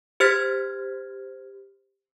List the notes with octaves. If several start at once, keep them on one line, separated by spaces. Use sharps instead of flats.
G4 C5 F6 G#6 A6 B6